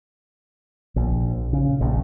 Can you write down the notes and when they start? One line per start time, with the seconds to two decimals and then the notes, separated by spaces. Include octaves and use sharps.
0.96 A#1
1.53 C#3
1.81 A#1